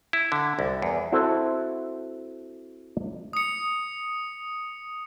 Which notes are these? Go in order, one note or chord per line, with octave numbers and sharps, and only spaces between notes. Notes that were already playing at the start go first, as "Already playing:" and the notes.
E4
D3
C2
E2
C4 E4 F#4 A4 C5
D#6 C#7